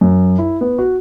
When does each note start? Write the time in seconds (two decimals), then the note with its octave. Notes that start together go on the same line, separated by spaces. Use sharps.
0.01 F#2
0.39 E4
0.61 B3
0.78 F#4